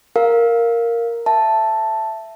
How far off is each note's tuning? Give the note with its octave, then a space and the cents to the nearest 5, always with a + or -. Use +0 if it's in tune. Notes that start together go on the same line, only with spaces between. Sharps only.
A#4 -5 F5 +0
E5 +10 A5 +0